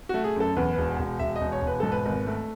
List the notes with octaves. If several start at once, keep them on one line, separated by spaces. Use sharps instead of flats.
A3 F#4
G#4
F#2 A4
E2 B4
B4
E1
E1
E1 E5
D#5
E1
C#5
E1
B4
G#2 A4
B4
G#1
A3